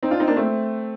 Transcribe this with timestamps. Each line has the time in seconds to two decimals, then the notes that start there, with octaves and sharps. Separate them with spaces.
0.03 C4 D#4
0.11 D4 F4
0.20 C4 D#4
0.27 A#3 D4
0.36 A3 C4